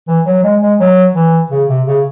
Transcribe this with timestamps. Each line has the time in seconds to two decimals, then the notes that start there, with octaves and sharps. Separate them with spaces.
0.08 E3
0.26 F#3
0.44 G#3
0.62 G#3
0.80 F#3
1.15 E3
1.51 C#3
1.69 C3
1.87 C#3